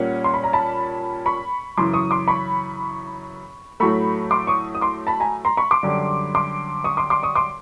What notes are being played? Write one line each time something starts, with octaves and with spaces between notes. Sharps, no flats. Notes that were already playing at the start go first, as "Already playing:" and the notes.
Already playing: A#2 G3 A#3 C#4 F#5
C6
B5
A#5
A5 B5
B5 C#6
F#2 C#3 E3 C6 D6
C#6 D#6
C6 D6
B5 C#6
A2 F#3 A3 B5 C#6
C6 D6
C#6 D#6
D#6
C6 D6
A5 B5
G#5 A#5
A#5 C6
B5 C#6
C6 D6
F#2 D3 G3
C6 D6
C#6 D#6
C6 D6
C6 D6
C#6 D#6
C6 D6